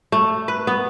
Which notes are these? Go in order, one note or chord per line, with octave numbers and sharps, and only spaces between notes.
A3
B4
B3